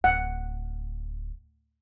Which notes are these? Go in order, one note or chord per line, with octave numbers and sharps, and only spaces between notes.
D1 F#5